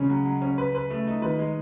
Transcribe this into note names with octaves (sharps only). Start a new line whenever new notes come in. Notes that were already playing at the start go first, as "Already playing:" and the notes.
Already playing: C#3 G#3 C#4
F#3
F#3
C#4
B4
B4
A3
D#4
D#3 B4
G#3